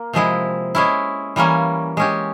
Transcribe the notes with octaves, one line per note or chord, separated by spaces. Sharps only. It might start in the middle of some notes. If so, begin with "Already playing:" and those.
Already playing: A#3
C3 F3 G#3 E4
G#3 C#4 E4
E3 G3 A#3 C#4
G#3 C#4 G4